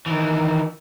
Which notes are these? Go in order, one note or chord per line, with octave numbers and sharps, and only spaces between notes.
D#3 E3